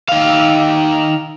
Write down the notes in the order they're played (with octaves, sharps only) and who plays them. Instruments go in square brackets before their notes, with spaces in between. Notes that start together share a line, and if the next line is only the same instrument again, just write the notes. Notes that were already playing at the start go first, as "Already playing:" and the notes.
[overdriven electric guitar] D#3 F5